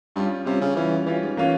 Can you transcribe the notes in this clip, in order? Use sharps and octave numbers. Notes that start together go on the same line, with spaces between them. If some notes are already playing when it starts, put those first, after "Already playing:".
G2 G3 C#4 F4
C3 G3 C#4 F4
C#3
E3 G3 C#4 F4
E3 G3 C#4 F4
G#2
E3 A#3 C#4 F4